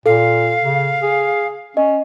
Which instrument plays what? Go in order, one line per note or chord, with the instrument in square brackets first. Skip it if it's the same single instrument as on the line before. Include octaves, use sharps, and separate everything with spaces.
[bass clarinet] A#2 [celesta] A4 [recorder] F5
[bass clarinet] C#3
G#4
[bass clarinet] C#4 [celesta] D#5